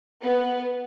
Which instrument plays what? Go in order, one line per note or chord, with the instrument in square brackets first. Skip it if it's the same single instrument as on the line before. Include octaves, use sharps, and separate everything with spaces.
[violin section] B3